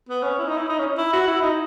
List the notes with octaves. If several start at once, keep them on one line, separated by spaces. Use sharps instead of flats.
B3
C#4
E4
D#4
E4
D#4
C#4
E4
F#4
E4
D#4